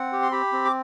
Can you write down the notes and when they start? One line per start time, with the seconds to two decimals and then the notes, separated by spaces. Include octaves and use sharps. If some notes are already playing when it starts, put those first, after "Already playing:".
Already playing: C4 F#5
0.12 G4
0.22 C6
0.32 G4 B5
0.52 C4
0.65 D6